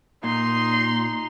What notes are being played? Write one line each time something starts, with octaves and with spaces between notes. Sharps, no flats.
A#2 D#4 C6